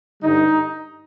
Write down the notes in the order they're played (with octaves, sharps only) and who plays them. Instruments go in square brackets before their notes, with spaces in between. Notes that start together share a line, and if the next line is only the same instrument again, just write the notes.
[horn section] G2 D3 G3 D#4